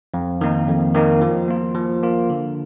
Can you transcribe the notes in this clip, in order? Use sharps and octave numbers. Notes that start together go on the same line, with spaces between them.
F2
D#3 A#3 D#4
F2
D#3 A#3 D#4
F3
A#3 F4
F3
A#3 F4
D3